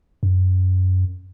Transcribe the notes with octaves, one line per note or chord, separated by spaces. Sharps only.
F#2